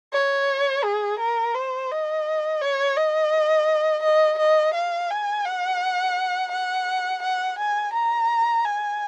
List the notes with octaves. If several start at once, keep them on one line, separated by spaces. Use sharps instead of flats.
C#5
G#4
A#4
C5
D#5
C#5
D#5
D#5
D#5
F5
G#5
F#5
F#5
F#5
G#5
A#5
G#5